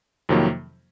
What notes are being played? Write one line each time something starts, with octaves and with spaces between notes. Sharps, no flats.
F2 C3 D#3 F#3 A#3